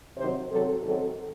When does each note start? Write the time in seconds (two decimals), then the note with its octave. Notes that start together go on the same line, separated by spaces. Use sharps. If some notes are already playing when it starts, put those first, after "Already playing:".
0.18 C3 D#3 F#3 C4 C5
0.51 C3 F#3 C4 A4
0.83 G#2 D#3 F#3 C4 A4